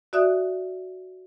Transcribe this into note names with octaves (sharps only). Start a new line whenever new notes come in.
F#4 D5 E5 D#6 F#6